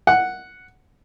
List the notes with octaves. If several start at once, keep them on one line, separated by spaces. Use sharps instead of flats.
F#5